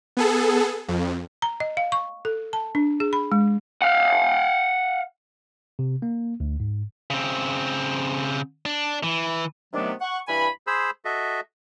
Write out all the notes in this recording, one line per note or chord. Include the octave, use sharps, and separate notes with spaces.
B3 G#4 A4
F2
A#5
D#5
F5
C#6
A4
A5
D4
G#4
B5
G#3
F5 F#5
C3
A#3
D2
G#2
C#3 C4
D4
E3
C3 D#3 F#3 A3 B3 D4
F#5 C#6
G2 E3 G#5 B5
G#4 C5 B5 E6
F#4 A4 D#5 E5